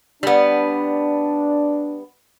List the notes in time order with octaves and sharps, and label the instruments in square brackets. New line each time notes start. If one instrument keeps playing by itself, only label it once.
[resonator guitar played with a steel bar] G3 B3 [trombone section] D4